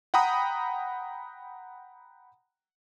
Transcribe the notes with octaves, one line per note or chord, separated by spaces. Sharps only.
F#5 G5 A#5 B5 D#6